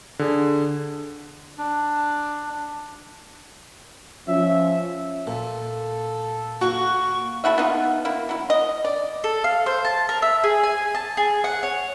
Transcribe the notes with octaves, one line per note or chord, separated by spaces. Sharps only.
D3 G#4
D4
F3 C#4 E5
A#2 A4
A#3 F#4 C#6
A3 E4 F#4 E5
B3 D#4 F4
A#3 E4
F#3 E4
D#5
D5
A4
F5
C5
A5
A#4
E5
G#4
G#5
A5
G#4
F#5
C#5